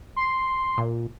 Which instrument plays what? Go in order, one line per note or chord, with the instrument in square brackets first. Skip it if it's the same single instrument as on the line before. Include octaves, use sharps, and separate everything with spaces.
[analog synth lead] C6
[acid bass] A#2